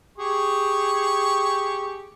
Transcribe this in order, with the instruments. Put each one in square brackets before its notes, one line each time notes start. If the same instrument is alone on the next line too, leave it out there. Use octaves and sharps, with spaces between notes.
[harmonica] G4 G#4 C#6